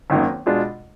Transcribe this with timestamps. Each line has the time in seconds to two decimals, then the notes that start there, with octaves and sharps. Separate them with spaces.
0.10 G#1 F#2 D#3 A#3
0.46 B2 G#3 D4 F4